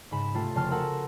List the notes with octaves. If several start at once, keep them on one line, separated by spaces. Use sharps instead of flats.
G#2 C#3 B5 E7
C3 A3 F4 A4
F1 C#3 A5 C6 F6
F#4 A4 A#4 F#5 A5 E6